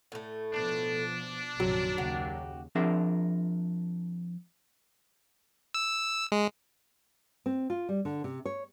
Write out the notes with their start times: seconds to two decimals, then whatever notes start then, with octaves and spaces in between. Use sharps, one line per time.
0.12 A2 A3
0.53 B2 F3 B3 D4
1.60 A#1 F#2 C3 D#3 F#3
1.98 D#2 C#3 F#4 G4
2.75 F3 C4 D4 G#4 A#4 E5
5.74 E6
6.32 G#3
7.46 C4
7.70 F4
7.89 G3
8.05 D3
8.24 C3
8.46 C#5